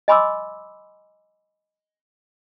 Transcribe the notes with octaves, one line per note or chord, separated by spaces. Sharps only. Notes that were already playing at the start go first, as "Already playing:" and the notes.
D#5 G#5 B5 C6 D6 E6